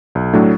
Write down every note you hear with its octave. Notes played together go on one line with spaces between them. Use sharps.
B1
A2 F#3 A3 D4